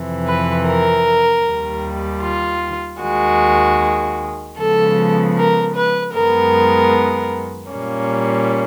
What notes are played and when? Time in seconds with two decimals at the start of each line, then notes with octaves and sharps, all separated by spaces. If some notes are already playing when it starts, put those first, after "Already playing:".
Already playing: F2 C3 E3
0.27 B4
0.67 A#4
1.45 D#2 D#3 G3
2.23 F4
3.01 D#2 D#3 G#3 F#4
4.58 C#3 F3 G#3 B3 A4
5.36 A#4
5.75 B4
6.14 F#2 D#3 G#3 B3 A#4
7.71 A#2 G3 A#3 C#4